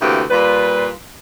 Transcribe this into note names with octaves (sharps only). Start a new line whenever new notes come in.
D2 C3 E3 A#3 G4
A#2 G3 F4 B4